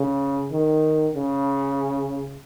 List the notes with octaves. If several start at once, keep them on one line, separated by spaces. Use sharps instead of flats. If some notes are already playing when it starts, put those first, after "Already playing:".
Already playing: C#3
D#3
C#3